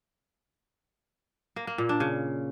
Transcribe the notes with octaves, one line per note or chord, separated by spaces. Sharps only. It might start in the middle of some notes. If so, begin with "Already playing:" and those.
A#3
A#3
A#2
D4
C#3